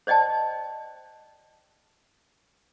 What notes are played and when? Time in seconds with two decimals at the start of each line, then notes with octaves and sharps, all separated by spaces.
0.07 C5 D5 D#5 G5 A5